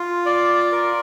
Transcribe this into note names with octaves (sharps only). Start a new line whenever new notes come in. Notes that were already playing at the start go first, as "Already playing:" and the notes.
Already playing: F4
D5
A#4